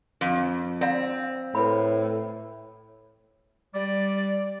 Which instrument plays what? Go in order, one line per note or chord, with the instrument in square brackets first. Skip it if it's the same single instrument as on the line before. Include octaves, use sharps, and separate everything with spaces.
[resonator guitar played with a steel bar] F2
[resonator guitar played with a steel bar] C4 [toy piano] D5 F5
[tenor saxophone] A2 [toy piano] B4 B5
[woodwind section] G3 D5